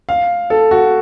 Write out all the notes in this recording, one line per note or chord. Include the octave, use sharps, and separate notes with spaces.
F5
A4
F#4